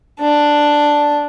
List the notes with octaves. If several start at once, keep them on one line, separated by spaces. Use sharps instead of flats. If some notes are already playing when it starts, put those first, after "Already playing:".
D4